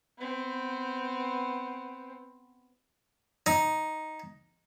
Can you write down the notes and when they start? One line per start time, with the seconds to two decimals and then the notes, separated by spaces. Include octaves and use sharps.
0.19 B3 C4
3.46 D#4